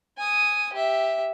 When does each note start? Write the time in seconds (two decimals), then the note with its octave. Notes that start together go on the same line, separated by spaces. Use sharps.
0.18 G#5 D#6
0.73 G4 E5